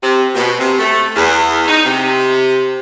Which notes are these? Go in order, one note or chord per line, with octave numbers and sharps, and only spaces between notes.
C3
B2
C3
A3
E2
D#4
C3